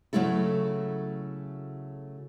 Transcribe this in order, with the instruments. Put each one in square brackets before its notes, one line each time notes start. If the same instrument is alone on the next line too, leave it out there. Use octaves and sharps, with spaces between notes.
[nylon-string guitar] C#3 E3 F#3 A3 E4 A4